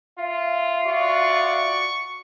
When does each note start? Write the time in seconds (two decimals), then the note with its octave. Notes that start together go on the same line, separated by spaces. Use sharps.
0.19 F4 E5
0.87 F#4 D5 C#6